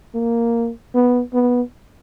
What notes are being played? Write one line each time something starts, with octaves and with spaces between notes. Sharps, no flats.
A#3
B3
B3